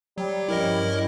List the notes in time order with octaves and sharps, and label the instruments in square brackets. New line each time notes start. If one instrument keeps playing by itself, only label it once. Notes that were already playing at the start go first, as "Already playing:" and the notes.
[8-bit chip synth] F#3 [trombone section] G3
[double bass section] G2 F3 C#4 [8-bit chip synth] E4 A#4 D#5